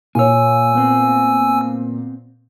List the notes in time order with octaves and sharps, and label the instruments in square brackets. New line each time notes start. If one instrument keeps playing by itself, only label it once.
[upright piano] A#2 [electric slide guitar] A#3 C#5 [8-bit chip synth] G#5 E6
[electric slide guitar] B3 C4